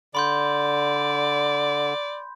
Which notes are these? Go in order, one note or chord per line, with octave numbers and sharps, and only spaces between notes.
D3 D5 B5 C6 G6